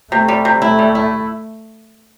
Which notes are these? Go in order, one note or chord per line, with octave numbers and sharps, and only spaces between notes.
C3 A3
G3
C3
A3 E4
G3
E4